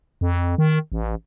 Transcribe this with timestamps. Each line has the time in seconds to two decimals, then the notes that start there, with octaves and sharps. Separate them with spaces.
0.21 F2
0.58 D#3
0.92 A1